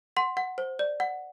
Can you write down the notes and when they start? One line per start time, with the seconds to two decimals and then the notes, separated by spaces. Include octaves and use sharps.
0.17 F#5 C6
0.37 F#5
0.58 C5
0.79 D5
1.00 F#5